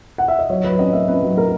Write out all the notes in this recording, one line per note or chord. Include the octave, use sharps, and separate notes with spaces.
F#5
E5
D#5
F#3 C#5
F#3 B4
C#4 D#5
A#3 E5
C#4 B4
F#3
A#3 A#4